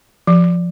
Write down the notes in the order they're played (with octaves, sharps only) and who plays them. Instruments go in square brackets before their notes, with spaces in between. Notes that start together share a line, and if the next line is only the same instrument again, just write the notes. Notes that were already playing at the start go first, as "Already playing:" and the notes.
[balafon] F3